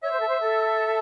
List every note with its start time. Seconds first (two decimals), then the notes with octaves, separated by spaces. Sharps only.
0.03 C#5 E5
0.11 C5
0.20 A4
0.28 C5
0.41 A4